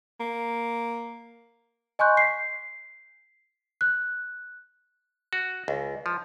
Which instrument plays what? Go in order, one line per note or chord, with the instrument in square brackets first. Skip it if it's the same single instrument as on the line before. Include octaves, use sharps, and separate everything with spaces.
[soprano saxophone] A#3
[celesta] D#5 G#5 C6 C#6 F#6 G6
B6 C7
F#6
[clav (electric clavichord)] F#4
C#2
F3